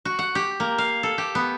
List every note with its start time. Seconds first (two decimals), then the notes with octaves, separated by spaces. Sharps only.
0.05 F#4
0.19 F#5
0.35 G4
0.60 A#3
0.78 F5
1.03 A4
1.18 G4
1.35 B3